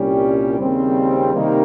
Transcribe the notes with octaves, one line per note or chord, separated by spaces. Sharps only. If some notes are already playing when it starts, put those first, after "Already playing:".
Already playing: C2 A#2 G3 C#4 G4
D#2 C#3 G3 C4
C3 D#3 G3 A#3 D#4